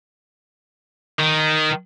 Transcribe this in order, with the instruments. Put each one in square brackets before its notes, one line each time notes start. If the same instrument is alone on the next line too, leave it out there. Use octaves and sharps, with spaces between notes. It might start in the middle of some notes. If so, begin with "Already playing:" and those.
[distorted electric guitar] D#3